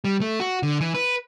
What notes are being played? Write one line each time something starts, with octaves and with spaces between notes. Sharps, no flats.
G3
A3
F#4
D3
E3
B4